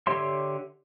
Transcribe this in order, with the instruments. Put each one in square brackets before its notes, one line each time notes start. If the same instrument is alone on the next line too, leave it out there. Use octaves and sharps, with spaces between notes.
[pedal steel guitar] D3 G4 C#5 E5 C6